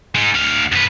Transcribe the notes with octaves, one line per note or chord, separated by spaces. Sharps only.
G#3 D#4
D2 F5
F#2 B4